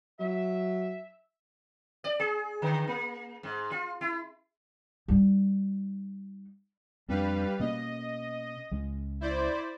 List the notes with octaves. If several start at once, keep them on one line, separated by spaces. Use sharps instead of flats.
F#3 E5
D5
G#4
D3
A#3
G#2
F4
E4
G3 D#4
F2 G3 D4 B4 F5
B2 A#3 C#4 D#5
C#2 G#3
E4 C5 D5